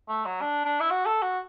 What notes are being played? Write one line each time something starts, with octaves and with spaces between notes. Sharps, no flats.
A3
F#3
D4
D4
E4
F#4
A4
F#4